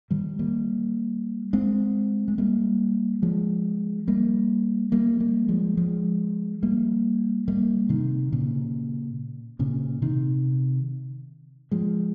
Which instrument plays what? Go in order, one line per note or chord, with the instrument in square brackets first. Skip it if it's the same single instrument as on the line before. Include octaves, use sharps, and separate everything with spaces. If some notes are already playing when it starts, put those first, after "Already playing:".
[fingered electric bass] D#3 G3
G3 A#3
G#3 C4
G#3
G3 A#3
F3 G#3
G3 A#3
G3 A#3
G3 A#3
F3 G#3
F3 G#3
G3 A#3
G3 A#3
C3 D#3
A#2 C#3
A#2 C#3
C3 D#3
F3 G#3